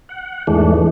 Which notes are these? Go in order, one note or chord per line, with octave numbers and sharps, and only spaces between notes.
F#5
E2 G#2 E3 G#3 A3 D4